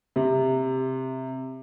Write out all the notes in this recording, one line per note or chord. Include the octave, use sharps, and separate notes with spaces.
C3